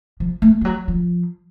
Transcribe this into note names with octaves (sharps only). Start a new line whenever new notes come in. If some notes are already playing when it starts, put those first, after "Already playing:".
F3
A3
F3
F#3
F3